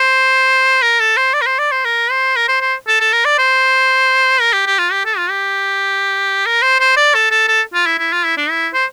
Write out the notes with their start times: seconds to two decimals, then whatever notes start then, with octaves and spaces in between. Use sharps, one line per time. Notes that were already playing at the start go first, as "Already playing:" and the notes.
Already playing: C5
0.82 A#4
1.00 A4
1.17 C5
1.34 D5
1.41 A#4
1.46 C5
1.59 D5
1.72 C5
1.85 A#4
2.11 C5
2.36 A#4
2.48 C5
2.61 C5
2.87 A4
3.00 A4
3.13 A#4
3.25 D5
3.39 C5
4.40 A#4
4.53 G4
4.66 G4
4.79 F4
4.92 G4
5.05 A4
5.18 F4
5.30 G4
6.46 A#4
6.62 C5
6.80 C5
6.97 D5
7.14 A4
7.31 A4
7.48 A4
7.74 F4
7.86 E4
7.99 E4
8.12 F4
8.25 E4
8.37 D4
8.50 E4
8.74 C5